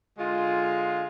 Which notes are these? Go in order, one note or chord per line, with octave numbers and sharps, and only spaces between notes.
D3 G#3 F4